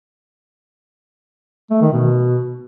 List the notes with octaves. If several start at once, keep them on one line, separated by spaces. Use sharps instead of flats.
A3
D#3
B2